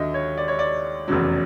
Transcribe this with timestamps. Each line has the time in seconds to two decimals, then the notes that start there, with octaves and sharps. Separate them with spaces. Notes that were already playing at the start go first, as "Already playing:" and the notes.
Already playing: D#2 D3 F#3 D#5 E5
0.14 C#5
0.37 D5
0.48 C#5
0.59 D5
1.08 F1 E2 C#3 F#3